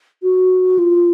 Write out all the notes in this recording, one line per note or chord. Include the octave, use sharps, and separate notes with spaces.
F#4
F4